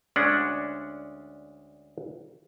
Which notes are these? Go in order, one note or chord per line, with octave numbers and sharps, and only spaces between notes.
D2 G#3 C#4 D4 F#5